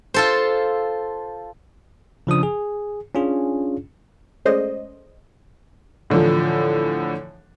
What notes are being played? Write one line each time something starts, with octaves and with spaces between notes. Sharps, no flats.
F4 A4 C5
C#3 F3 D4 D#6
G#4
C#4 D4 F4 G#4
G#3 A3 C#4 C5 D5 D#5
A2 D3 E3 F3